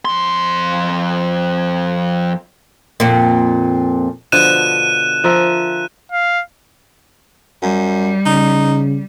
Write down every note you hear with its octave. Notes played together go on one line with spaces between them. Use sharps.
F2 C6
F2 A#2
B2 D3 F3 F#6 D#7 E7
F3 A#4 E5
F5
F#2 G3
C#3 D#4